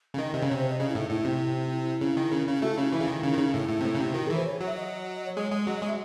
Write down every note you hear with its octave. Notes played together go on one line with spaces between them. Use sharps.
C#3
D#3 D#5
C3 D#5
C#3
C#5
C3
C5
D#5
C#3 D#5
E4
A2
D#4
A2 E4
C3
E4
C#3
D#3
C#3
C#3
E4
A3 F#4
E4
C#3 D#4
E4
E3
C#3
D#3
C#3 D#4
D#3
C#3
A2 E4
A2
C3
A2
C#3
C3
D#3 F#4
G#4
E3
C5
C#5
F#3
E5
D#5
D#5
C#5
G#3 C#5
G#3
F#3 D#5
D#5
G#3
E5